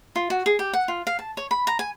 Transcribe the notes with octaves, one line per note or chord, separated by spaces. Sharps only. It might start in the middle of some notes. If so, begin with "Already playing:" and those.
F4
F#4
G#4
G4
F#5
F4
F5
A5
C#5
B5
A#5
G#5